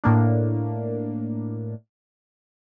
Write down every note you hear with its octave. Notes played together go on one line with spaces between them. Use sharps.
A2 A#3 D4